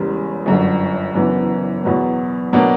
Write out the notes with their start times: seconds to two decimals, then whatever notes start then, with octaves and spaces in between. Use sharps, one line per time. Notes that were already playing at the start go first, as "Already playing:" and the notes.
Already playing: E1 E2 C#3 G3
0.46 G1 F#2 D3
1.14 F#1 F#2 E3 B3 D4
1.83 E2 B2 F#3 B3
2.53 B2 F#3 A#3 D4